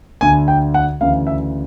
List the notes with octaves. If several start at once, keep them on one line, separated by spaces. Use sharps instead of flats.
D2 D3 G#5
G5
F#5
D2 C#3 E3 F5
E5